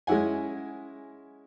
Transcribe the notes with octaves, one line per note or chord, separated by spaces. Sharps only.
G#3 C#4 E4 F#5 G#5